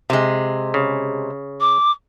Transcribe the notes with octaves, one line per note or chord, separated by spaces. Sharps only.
C3 G#3
C#3
D6